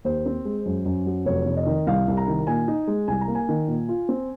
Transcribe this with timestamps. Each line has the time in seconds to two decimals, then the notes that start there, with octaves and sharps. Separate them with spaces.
0.04 D#2 C5
0.26 C4
0.45 G#3
0.66 F#2
0.85 F#2
1.06 F#3
1.26 F1 C#5
1.46 F1
1.56 D#5
1.67 D#3
1.87 C2 F5
2.08 C2
2.17 A#5
2.28 D#3
2.47 A#2 G#5
2.68 D#4
2.87 G#3
3.08 C2 G#5
3.21 A#5
3.28 A#3
3.35 G#5
3.49 D#3
3.68 A#2
3.89 F4
4.09 C4